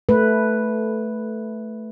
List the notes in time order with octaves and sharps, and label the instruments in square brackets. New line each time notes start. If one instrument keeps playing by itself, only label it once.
[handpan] A3 B4